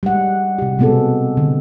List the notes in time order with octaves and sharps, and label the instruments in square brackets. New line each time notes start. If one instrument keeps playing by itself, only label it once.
[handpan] G3 G#3 F#5
C3 G4
B2 G#3 B3 C4 G#4 A4
D3